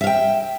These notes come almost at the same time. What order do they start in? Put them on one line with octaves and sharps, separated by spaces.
E5 F5 G5